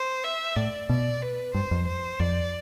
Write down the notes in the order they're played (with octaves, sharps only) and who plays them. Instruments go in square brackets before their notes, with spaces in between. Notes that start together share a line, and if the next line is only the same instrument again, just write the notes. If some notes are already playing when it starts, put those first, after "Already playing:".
Already playing: [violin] C5
E5
[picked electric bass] A2 [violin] D5
[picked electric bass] B2 [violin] D5
[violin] B4
[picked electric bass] G2 [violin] C5
[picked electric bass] F2
[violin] C5
[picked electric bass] F2 [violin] D5